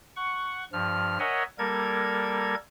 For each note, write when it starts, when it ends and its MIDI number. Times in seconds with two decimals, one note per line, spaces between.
0.16 0.64 78
0.16 0.64 85
0.73 1.18 43
0.73 1.18 53
0.73 1.18 89
1.19 1.43 70
1.19 1.43 73
1.19 1.43 75
1.19 1.43 76
1.19 1.43 78
1.19 1.43 80
1.58 2.55 55
1.58 2.55 58
1.58 2.55 69
1.58 2.55 70
1.58 2.55 92